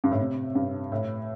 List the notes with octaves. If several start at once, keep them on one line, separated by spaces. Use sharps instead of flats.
G2
A2
C3
G2
A2